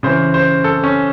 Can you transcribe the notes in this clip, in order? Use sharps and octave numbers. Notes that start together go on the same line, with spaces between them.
C#3 E3 C5
C5
A4
C#4